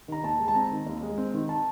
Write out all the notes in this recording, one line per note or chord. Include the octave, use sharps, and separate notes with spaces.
D#3 A#5
D#2 A5
G#3
A5
C4 A#5
D#3
D#2
G#3
C4
D#3
A5